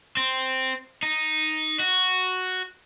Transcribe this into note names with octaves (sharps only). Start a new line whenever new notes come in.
C4
D#4
F#4